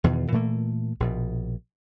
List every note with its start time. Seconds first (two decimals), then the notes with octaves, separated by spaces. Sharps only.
0.04 E2 B2 D#3
0.32 A#2 E3 A3 A#3
1.00 A#1 B2